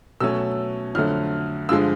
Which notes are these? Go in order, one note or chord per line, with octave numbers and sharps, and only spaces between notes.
B2 F#3 A3 C#4 E6
F2 D3 F#3 A3 F6
G2 D3 F3 G#3 E6